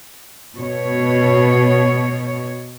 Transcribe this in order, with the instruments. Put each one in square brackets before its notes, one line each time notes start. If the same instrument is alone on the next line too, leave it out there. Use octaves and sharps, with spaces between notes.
[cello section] B2 C#5